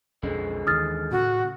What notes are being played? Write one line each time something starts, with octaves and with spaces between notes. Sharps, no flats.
B1 F2 D3 G#3 C#4
D#2 D#3 E3 D#6 F6 A6
A2 C#3 F#4